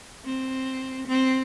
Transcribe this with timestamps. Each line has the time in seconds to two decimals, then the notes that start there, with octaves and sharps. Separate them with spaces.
0.25 C4
1.07 C4